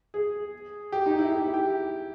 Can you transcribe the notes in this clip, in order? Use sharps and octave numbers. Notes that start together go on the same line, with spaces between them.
G#4
G4
D#4
E4
G4
E4
G4